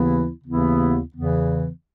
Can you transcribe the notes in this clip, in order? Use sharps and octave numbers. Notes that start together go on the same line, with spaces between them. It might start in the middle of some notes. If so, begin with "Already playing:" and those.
Already playing: D#2 C#3 E3 B3 E4
D#2 C#3 E3 B3 E4
E2 C#3 E3 B3